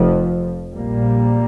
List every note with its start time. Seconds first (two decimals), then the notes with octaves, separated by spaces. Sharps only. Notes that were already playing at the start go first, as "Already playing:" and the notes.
Already playing: F1 F2 F3
0.74 A#1 A#2 G3 A#3